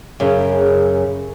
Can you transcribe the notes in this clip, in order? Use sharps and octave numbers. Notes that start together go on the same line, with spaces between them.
F#2 C#3 G#4